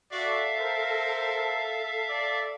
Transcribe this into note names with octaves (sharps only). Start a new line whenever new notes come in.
F#4 A4 D5 E5 F5
A#4 C5
D5